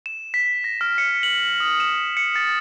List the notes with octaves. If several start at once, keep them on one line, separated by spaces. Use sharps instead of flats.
E7
B6
A#6
F6
C#7
F#7
D#6
E7
C#7
A6